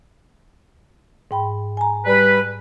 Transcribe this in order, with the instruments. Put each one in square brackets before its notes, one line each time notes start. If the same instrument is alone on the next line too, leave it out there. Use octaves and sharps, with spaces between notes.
[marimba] G#2 G5 B5
G#5 A#5
[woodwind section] G3 B4